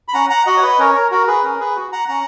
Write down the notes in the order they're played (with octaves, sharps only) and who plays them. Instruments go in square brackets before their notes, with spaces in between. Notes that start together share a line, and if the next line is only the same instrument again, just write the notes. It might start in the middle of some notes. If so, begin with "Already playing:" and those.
[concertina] B5
C#4 F#5 A#5
F#5 A#5
F#4 D#5 F#5
C#5
B4 D#5
C#4 A#4 C#5
A#4
F#4 A#4
G#4 B4
C#4 A#4
G#4 B4
F#4
F#5 A#5
C#4 F#5 A#5